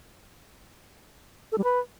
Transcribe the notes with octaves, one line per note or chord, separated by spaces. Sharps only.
A4
G3
B4